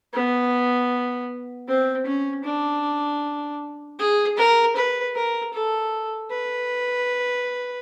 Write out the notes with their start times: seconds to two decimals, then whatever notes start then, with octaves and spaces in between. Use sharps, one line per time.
0.13 B3
1.68 C4
2.06 C#4
2.44 D4
3.99 G#4
4.37 A#4
4.76 B4
5.15 A#4
5.54 A4
6.31 B4